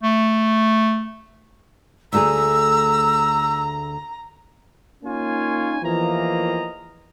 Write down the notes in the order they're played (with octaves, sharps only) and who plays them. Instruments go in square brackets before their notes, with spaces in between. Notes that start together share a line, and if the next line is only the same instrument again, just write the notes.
[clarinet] A3
[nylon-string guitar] D2 A3 G#4 [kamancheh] A#5 [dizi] E6
[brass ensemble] A#3 C#4 D#4 F4 C#5 G#5
E2 E3 F3 A#3 D#5 A#5